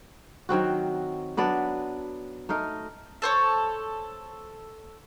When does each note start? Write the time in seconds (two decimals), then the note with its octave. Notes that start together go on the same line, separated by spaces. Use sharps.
0.49 D#3 F#3 C4 F#4
1.37 F#3 B3 D4 D5
2.49 A3 D#4 A#4
3.22 A4 C5 C#5